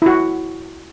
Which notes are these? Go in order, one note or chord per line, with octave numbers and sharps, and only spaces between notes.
E4
F#4